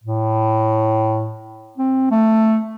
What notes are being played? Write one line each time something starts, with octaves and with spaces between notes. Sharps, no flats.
A2
C4
A3